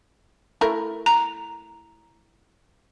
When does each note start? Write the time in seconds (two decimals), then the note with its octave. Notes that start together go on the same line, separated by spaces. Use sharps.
0.61 A3 E4 A#4
1.06 A#5